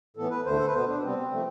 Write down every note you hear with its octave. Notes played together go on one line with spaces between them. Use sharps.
A2 E3 B3 A4
B4
D2 D3 A3 C5
A4
B4
B2 B3 C5
D4
C3 G3 B3 C4
F3 A3